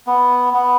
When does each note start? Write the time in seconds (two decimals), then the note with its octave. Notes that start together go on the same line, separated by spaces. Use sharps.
0.07 B3
0.53 B3